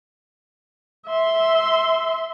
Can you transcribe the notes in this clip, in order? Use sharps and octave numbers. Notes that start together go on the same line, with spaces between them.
E5 C6